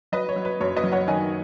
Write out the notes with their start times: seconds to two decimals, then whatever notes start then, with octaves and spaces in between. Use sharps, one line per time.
0.12 F#3 B4 D#5
0.29 C#5
0.36 F#3
0.45 B4
0.61 F#2 C#5
0.76 B4 D#5
0.84 F#3
0.92 C#5 F#5
1.08 D#3 D#5 G#5